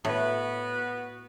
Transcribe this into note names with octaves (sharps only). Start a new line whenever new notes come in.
A2 B3 F#4 B4